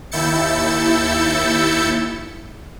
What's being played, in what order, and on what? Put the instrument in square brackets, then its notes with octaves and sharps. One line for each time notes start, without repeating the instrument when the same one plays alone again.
[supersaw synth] D#2 E4 E6 G6 A6 C#7